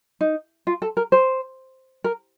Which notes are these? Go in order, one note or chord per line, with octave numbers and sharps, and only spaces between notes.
D#4
F4
A4
A#4
C5
A#4